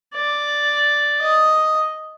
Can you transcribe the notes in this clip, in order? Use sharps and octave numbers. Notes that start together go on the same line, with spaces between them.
D5
D#5